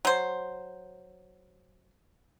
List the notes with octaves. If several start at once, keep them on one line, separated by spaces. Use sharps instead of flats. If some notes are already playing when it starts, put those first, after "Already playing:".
F#3 C5